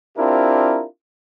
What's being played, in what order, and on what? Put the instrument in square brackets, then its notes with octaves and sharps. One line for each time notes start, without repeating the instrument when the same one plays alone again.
[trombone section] C4 D4 E4 F4 G4 A#4